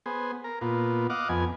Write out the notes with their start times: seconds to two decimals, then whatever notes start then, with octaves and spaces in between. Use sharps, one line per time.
0.06 B3 G#4 C5
0.44 A#4
0.61 A#2 B3 F4
1.10 D#5 F5 F#5 D6
1.29 F2 B3 G#5